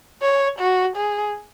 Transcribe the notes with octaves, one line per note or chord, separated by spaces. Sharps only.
C#5
F#4
G#4